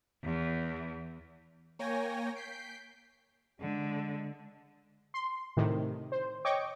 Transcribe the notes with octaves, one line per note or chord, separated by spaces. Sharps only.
E2
A#3 C#5 G5 G#5 A#6
G6 B6 C7 D7
D3 G#3
C6
A2 C3 D#3
C5
C#5 D#5 G5 C#6 D6